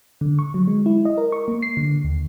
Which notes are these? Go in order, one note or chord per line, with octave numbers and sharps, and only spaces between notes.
D3
C#6
F#3
G#3
E4
D#5
A#4
C#6
A#3
C7
D3
D#2